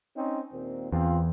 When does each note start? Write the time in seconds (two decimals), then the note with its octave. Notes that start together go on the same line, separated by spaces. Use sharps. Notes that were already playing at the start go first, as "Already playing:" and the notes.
0.16 C4 C#4 D#4
0.52 D#2 A#2 C4
0.92 E2 C4 F4